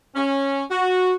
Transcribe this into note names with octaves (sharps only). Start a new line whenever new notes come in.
C#4
F#4